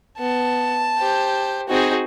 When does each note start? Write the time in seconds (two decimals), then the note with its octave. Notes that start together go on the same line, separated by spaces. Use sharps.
0.18 B3 A5
0.98 G4 C5
1.69 C4 D#4 F#4 G#4